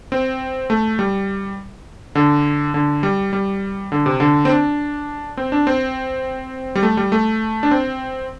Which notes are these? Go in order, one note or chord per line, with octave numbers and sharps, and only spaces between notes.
C4
A3
G3
D3
D3
G3
G3
D3
C3
D3
C4
D4
C4
D4
C4
G3
A3
G3
A3
D4
C4